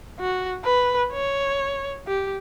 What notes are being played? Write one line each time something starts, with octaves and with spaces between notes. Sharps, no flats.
F#4
B4
C#5
G4